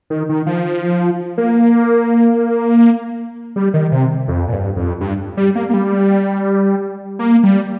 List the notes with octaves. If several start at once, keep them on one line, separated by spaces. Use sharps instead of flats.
D#3
D#3
F3
A#3
G3
D#3
C3
F2
A#2
G2
F2
G2
G3
A#3
A#3
G3
A#3
G3